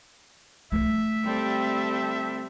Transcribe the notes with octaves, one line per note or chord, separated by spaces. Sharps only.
D3 A3 E5
G3 C4 A4